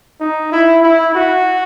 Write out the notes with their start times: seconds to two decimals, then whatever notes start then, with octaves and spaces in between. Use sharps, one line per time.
0.20 D#4
0.52 E4
0.83 E4
1.15 F#4